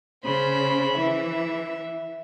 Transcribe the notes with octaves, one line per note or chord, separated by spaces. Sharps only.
C#3 C5 B5
E3 E5